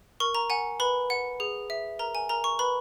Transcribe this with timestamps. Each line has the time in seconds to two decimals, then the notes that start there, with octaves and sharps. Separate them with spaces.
0.20 A#4 C#6
0.35 A#5
0.50 F#5 G#5
0.80 B4 B5
1.10 F#5
1.40 G#4
1.70 E5
1.99 A#4 A#5
2.15 G#5
2.29 A#4 A#5
2.44 C#6
2.59 B4 B5